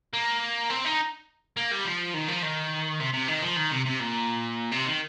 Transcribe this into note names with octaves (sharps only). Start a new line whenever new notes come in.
A#3
C4
D#4
A#3
G3
F3
D#3
F3
D#3
C3
C3
D#3
F3
D#3
C3
C3
A#2
C3
D#3